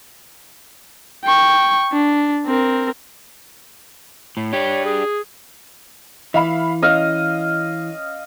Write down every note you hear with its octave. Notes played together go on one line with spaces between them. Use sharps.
G5 C#6
D4
C4 A#4
A2
D4 G4 C#5
G#4
E3 E5 F5 B5
C#4 D#5 F5